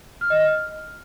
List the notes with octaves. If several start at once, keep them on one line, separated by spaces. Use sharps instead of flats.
F6
D#5
F6